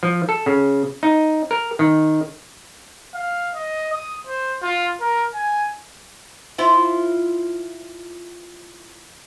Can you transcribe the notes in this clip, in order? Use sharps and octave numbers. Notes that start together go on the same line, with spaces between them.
F3
A4
C#3
D#4
A#4
D#3
F5
D#5
D#6
C5
F4
A#4
G#5
E4 F4 C5